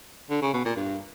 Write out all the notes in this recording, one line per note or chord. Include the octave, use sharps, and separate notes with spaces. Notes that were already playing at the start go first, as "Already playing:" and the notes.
D3
C#3
B2
A#2
G2